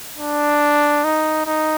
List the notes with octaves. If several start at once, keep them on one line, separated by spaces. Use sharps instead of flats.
D4
D#4
D#4